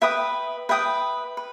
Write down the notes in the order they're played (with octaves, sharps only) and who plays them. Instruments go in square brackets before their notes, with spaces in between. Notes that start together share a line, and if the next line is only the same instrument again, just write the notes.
[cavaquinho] B4 E5 G5 D#6
B4 E5 G5 D#6
B4